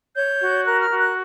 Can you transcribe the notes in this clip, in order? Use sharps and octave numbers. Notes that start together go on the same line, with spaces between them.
C#5 G6
F#4
A#4 F#6
F6
F#4
F#6